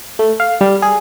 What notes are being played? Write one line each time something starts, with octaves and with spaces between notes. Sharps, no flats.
A3
F5
G3
G#4